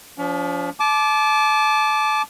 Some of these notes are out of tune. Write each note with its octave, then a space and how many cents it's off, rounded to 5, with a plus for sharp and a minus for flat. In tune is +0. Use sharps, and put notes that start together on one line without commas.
F3 +0 C#4 +45
A5 -30 D6 +0